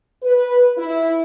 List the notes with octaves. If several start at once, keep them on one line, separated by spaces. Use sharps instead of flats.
B4
E4